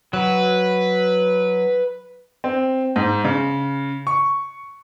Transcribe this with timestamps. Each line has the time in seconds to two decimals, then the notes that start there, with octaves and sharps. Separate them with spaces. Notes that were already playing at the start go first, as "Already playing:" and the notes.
0.13 F#3 B4
2.44 C4
2.96 G#2
3.24 C#3
4.07 C#6